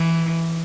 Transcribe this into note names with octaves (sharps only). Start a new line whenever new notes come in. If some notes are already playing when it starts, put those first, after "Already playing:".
Already playing: E3